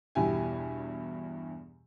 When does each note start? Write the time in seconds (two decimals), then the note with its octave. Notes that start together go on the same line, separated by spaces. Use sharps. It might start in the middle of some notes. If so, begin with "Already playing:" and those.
0.15 E2 G2 B2 E4 G4 G#5